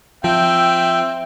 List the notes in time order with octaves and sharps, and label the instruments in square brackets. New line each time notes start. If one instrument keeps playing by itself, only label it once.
[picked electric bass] F3 [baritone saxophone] C4 [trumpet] E5 [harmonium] G5